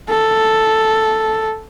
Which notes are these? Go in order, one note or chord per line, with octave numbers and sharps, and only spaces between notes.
A4